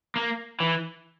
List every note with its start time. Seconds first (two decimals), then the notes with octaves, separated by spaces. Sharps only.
0.16 A#3
0.60 E3